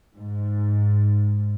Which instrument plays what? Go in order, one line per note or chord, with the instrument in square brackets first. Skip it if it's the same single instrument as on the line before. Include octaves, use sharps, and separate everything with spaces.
[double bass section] G#2